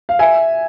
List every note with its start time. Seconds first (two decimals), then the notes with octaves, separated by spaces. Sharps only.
0.09 F5
0.19 E5 G#5